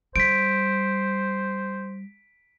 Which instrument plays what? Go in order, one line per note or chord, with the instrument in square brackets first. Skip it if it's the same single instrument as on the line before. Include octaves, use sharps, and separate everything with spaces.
[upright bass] G3 [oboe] C5 [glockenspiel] B6 D7